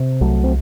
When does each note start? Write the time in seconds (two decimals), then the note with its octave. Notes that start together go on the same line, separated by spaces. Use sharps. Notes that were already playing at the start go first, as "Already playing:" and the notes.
Already playing: C3
0.21 C2 F#3 A3
0.44 C4